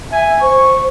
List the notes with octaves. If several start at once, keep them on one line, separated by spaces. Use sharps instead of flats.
E5 G#5
C5 C#6